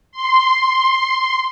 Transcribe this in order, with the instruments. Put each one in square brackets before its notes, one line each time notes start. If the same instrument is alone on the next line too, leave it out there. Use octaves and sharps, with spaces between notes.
[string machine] C6